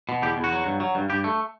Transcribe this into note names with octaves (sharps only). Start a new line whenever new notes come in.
B2
E2 G4
E2
F#4
F#3
G2
F#3
G2
G2 G4
A3